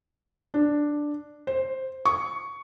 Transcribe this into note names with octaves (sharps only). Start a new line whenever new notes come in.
D4
C5
C#6